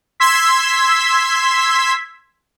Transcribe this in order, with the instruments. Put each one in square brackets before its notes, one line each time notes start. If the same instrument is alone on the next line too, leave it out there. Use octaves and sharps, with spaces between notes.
[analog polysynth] C6 E6 G#6 B6